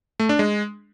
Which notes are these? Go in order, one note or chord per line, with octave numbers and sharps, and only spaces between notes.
A3
D4
G#3